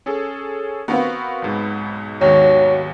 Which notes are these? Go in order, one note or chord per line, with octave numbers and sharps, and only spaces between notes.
C#4 G#4 A4
B3 C4 F#4 A#4 F5
B1 G#2 B2
D#2 G#2 F#3 B3